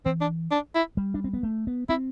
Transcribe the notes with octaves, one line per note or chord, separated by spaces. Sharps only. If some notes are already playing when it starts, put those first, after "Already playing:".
E3 C4
D4
D4
E4
G3
D4
C4
B3
A3
B3
C4 E4